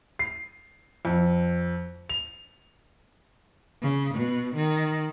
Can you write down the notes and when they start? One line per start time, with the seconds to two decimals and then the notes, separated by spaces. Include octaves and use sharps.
0.19 C7
1.05 F2
2.09 F7
3.82 C#3
4.14 B2
4.55 D#3